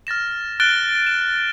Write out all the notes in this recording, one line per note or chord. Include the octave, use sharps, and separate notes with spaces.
F6 A6 A#6 E7
F6 F#6 A6 D7 G7
E7